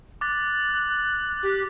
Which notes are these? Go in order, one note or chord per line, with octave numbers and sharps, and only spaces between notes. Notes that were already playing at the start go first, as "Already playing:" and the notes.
D6 F#6 A6
G4